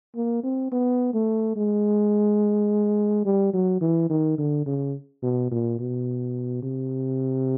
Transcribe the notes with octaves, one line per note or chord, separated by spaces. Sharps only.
A#3
C4
B3
A3
G#3
G3
F#3
E3
D#3
D3
C#3
B2
A#2
B2
C3